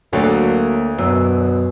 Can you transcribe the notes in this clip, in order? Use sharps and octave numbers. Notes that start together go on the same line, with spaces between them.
D2 F#3 A#3 A4
F#2 B2